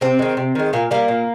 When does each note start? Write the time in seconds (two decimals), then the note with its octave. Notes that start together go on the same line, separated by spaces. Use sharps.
0.01 C3 C4
0.19 D#3 G#3
0.37 C3
0.55 D#3 G#3
0.73 A#2 A#3
0.91 G3 A#3
1.08 A#2